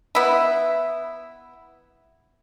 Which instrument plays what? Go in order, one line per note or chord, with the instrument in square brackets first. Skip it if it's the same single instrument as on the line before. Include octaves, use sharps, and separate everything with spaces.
[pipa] B3 E4